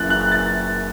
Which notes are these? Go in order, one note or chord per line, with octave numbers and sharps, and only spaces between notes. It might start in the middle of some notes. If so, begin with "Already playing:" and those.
Already playing: F#1 F#2 E3 F#6 A6
F#6
A6